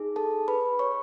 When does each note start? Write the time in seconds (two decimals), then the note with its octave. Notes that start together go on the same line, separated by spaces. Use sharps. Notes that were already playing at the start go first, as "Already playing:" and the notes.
Already playing: D#4 G#4
0.16 A4 A5
0.48 B4 B5
0.79 C#5 C#6